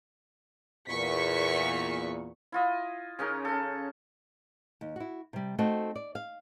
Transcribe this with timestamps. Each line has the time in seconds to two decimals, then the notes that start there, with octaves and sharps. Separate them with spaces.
0.89 E2 A#2 C#6 B6
2.52 E4 F4 D#5
3.19 C#3 C#4 D#4 A#4
3.45 C#4 A4
4.81 D#2
4.96 E4 F#4
5.33 C3 G3
5.58 A3 C4 D#4 F#4
5.96 D5
6.15 F5